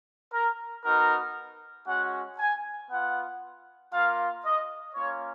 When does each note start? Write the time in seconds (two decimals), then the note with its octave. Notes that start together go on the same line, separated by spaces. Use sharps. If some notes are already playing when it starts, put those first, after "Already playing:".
0.32 A#4
0.83 B3 D#4 F#4 A#4
1.86 G#3 C#4 F#4 F#5
2.37 G#5
2.88 B3 F4 F#5
3.92 A#3 F4 F5
4.43 D#5
4.95 A#3 C#4 F4 C#5